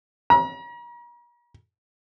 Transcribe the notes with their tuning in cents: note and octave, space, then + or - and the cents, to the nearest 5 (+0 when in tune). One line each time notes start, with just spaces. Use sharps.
A#5 +40